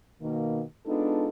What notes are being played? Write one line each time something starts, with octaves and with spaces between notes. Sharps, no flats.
B2 D#3 A#3
G#3 B3 D4 D#4 F4 A4